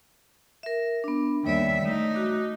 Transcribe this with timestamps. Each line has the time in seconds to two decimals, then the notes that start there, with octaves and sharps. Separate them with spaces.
0.63 A#4 E5
1.04 B3 D4
1.44 D#2 G3 C#5 D5 E5
1.83 A3 D#4
2.14 F#4 D6